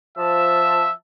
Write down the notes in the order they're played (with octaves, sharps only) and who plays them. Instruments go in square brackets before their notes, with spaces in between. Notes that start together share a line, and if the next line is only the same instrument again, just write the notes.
[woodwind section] F3 A5 [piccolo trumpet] E5